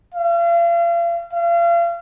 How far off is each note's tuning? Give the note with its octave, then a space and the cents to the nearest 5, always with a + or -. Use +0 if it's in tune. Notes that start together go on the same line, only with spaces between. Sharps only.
F5 -40
F5 -35